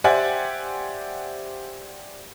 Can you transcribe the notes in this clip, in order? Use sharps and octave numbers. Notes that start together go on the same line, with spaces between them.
G4 C5 D5 E5 F#5 G#5